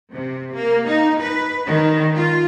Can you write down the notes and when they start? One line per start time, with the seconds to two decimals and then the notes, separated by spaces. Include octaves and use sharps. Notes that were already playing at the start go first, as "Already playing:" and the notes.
0.12 C3
0.53 A#3
0.85 D#4
1.20 B4
1.66 D#3
2.15 F4